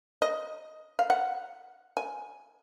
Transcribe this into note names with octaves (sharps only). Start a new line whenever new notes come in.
D#5
F5
F#5
G#5